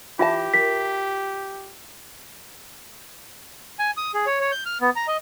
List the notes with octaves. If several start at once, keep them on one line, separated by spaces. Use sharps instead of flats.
E3 F4 G4 E5 A5
A#4 B6
G#5
D#6
G#4
C#5
C#5
G6
F6
B3
A#5
D#5